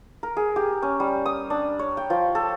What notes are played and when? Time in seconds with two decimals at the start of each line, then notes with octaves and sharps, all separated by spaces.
0.23 A#4
0.37 G#4
0.56 G4
0.82 C#4
1.00 G3
1.26 D#6
1.50 D4
1.79 C#5
1.97 G5
2.10 F3
2.35 A4